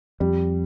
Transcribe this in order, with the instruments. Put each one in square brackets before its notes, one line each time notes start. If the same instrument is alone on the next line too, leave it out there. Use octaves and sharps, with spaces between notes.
[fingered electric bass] F2 [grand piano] G3